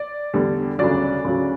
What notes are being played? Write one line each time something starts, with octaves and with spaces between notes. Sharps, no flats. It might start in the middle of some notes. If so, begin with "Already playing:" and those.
Already playing: D5
E2 D3 G3
D2 C#3 F#3 D5
D2 C#3 F#3